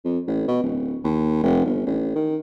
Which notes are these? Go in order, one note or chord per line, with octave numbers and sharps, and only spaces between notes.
F2
A1
B2
D1
D#2
F1
G1
A1
D#3